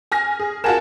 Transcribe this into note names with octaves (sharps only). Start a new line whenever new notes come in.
G#5 F6 A#6
G#4
F4 F#4 A#4 G#5 A5 E7